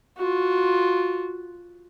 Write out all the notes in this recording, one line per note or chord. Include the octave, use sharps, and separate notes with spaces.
F4 F#4